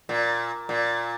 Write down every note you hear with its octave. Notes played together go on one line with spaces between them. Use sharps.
A#2
A#2